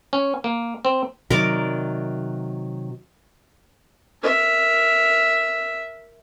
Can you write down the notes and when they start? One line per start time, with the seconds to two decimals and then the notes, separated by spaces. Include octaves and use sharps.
0.13 C#4
0.44 A#3
0.85 C4
1.30 C3 D#3 F#3 A#4 D5
4.22 A#4 E5